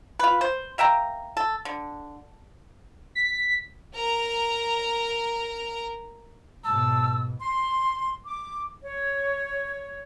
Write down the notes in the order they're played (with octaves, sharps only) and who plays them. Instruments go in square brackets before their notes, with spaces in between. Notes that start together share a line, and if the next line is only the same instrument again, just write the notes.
[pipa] F4 B4
C5
A#3 E5 G5 A#5
A4
D3
[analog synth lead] B6
[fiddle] A#4 A#5
[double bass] G#2 B2 [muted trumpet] A5 [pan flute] E6
[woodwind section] C6
D6
C#5